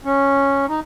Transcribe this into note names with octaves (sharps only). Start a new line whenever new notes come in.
C#4
D#4